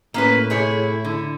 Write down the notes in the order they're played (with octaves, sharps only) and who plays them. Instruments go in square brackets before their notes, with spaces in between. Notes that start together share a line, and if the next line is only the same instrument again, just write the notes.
[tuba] A2 [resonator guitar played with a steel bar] A#3 C#4 B4
[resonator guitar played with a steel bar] C3 G#4 C#5 [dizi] E4
[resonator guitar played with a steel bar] D3